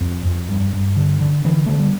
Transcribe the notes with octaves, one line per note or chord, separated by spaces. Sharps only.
F2
F2
G2
G2
D3
D3
D3 E3
D3 A3
G3